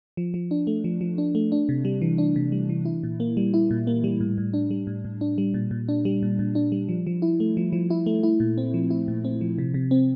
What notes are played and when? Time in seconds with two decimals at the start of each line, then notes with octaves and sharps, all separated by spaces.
0.17 F3
0.34 F3
0.51 D4
0.67 A3
0.84 F3
1.01 F3
1.18 D4
1.35 A3
1.52 D4
1.69 C3
1.85 G3
2.02 E3
2.18 D4
2.36 C3
2.52 G3
2.69 E3
2.85 E4
3.03 A#2
3.20 A#3
3.37 G3
3.54 E4
3.71 A#2
3.87 A#3
4.04 G3
4.20 A2
4.38 A2
4.54 D4
4.71 G3
4.87 A2
5.05 A2
5.21 D4
5.38 G3
5.54 A#2
5.71 A#2
5.89 D4
6.05 G3
6.23 A#2
6.39 A#2
6.55 D4
6.72 G3
6.89 F3
7.07 F3
7.22 E4
7.40 A3
7.57 F3
7.73 F3
7.90 E4
8.06 A3
8.23 E4
8.40 A#2
8.58 C4
8.74 F3
8.90 E4
9.08 A#2
9.25 C4
9.41 F3
9.58 C3
9.74 C3
9.91 C4